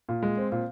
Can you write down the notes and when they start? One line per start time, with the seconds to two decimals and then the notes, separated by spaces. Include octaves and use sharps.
0.09 A#2
0.22 G#3
0.37 C4
0.52 A#2